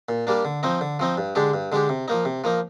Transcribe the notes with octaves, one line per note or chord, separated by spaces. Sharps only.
A#2
G3 A#3 D4
D3
F3 C4 D#4
D3
F3 C4 D#4
G2
D3 G#3 D4 G4
G2
D3 G#3 D4 G4
C3
F3 A#3 D#4
C3
F3 A#3 D#4